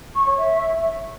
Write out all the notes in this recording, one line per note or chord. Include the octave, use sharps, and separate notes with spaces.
C#6
C#5
E5